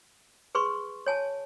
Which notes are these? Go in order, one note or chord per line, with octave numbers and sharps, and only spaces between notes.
G#4 B4 C6 C#6
C#5 G#5 A5